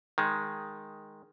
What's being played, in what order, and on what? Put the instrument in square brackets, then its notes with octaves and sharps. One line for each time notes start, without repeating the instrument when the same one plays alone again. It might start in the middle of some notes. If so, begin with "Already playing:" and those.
[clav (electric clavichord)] D#3 G#3